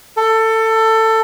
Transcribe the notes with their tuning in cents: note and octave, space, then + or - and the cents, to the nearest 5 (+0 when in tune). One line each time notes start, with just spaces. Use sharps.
A4 +20